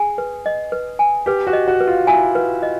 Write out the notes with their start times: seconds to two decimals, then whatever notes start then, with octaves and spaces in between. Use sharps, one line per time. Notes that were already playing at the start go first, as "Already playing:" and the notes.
Already playing: G#4 G#5
0.18 B4
0.46 D#5
0.72 B4
0.99 G#5
1.26 G4 B4
1.47 F#4
1.53 D#5
1.68 F#4
1.80 B4
1.87 F4
2.07 E4 G#5
2.35 B4
2.63 D#5